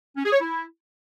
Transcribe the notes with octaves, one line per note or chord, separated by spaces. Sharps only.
C#4
G#4
C#5
E4